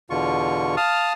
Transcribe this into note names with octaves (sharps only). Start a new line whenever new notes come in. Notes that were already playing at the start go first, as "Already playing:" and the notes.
E2 B2 D3 F4 C#6
F5 A5 D#6 F6